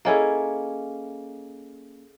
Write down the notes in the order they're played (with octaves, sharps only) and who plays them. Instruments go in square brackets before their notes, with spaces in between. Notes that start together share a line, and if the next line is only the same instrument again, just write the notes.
[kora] A#3 C#4 E4 [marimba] G#4 A4 D#5